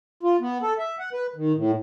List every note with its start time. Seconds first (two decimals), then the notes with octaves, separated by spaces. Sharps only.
0.23 F4
0.41 B3
0.62 A4
0.79 E5
0.99 F#5
1.13 B4
1.36 D#3
1.55 A2